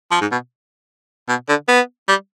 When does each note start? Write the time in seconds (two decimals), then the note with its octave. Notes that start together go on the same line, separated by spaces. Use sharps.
0.11 F3
0.21 G#2
0.32 B2
1.29 B2
1.49 D3
1.68 B3
2.08 G3